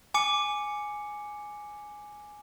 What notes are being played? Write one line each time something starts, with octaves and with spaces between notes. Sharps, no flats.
G#5 D6 C#7